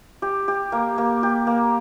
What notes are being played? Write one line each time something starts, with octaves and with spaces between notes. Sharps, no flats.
G4
G4
A#3
A#3
G4
A#3